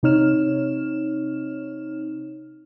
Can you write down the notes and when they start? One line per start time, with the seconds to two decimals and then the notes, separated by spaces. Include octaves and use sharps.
0.03 C3 C4 D#4 C#5 F6 E7